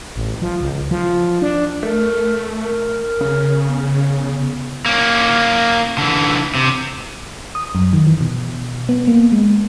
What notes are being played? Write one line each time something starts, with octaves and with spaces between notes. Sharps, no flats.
A1
F3
C#2
F3
D4
A3 A#4
A#4
C#3
B3
A#3 C#4
D3 E3
C3
D#6
F#2
D#3
E3
B2
B3
A#3
G#3